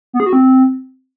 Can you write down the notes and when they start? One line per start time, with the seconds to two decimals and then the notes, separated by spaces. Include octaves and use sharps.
0.13 B3
0.20 G#4
0.26 F#4
0.33 C4